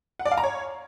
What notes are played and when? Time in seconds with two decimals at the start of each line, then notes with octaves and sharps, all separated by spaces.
0.19 F#5
0.25 D5
0.31 F5
0.38 A#5
0.44 C#5